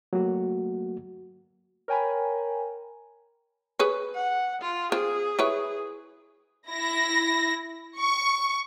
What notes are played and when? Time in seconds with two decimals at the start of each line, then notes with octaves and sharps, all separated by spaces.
0.13 F#3 A3 A#3 F#4
1.88 A#4 C#5 G5 G#5 A#5 B5
3.79 G#4 B4 C#5
4.15 F#5
4.62 F4
4.92 C4 F4 G#4
5.39 E4 B4 C#5
6.69 E4 A#6
7.98 C#6